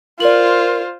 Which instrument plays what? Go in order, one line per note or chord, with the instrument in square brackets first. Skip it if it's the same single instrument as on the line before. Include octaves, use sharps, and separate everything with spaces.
[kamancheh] F4 C5 [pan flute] A#4 [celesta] D5 F#7